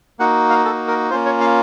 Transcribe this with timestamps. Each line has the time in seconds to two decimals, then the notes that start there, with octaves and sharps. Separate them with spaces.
0.19 A#3 D#4 F#4 F#5
0.50 F5
0.65 A4
0.88 A#4
1.10 A#3 C#4 F4 C5
1.26 C#5
1.41 F5